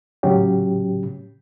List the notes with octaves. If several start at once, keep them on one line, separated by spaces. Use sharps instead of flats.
A2 C#3 F#3 C#4 G4